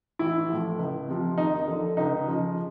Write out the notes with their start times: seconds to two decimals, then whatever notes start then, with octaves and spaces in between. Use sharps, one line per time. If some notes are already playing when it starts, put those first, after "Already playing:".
0.19 A1 E4
0.49 A2 F3
0.79 C#2
1.08 C3 F3
1.38 D#2 D#4
1.68 D3 F3
1.97 C#2 D#4
2.27 C#3 F3